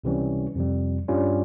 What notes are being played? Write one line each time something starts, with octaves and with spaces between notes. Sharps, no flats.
C#2 C3 E3 G3 C#4
F2 C3 G3
G2 G3 C#4 F4